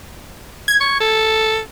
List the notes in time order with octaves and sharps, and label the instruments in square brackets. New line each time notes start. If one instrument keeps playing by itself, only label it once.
[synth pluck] G#6
[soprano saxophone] C#6
A4